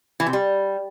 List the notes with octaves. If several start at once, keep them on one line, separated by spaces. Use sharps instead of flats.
E3
C3
G3